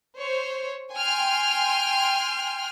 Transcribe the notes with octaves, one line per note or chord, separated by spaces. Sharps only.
C5 C#5
G5 G#5 C6 F6